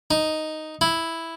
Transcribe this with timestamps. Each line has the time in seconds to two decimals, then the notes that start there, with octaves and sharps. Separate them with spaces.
0.11 D#4
0.81 E4